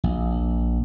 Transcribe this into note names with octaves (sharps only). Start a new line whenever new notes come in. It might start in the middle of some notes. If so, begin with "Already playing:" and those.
A#1